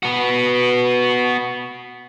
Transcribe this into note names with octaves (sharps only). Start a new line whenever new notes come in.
B3 F#4